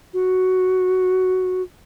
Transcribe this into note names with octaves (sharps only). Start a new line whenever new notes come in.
F#4